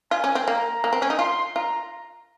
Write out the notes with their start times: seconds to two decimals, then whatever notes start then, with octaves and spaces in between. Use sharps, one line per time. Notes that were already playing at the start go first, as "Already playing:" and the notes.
0.11 F4 G#5
0.24 C#4
0.35 C4
0.47 A#3 A#5
0.84 A#3
0.93 C4
1.02 C#4
1.10 D#4
1.19 F4 C6
1.55 F4 A#5